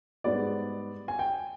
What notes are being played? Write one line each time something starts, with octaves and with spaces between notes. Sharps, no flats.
G#2 G3 B3 D5
G#5
G5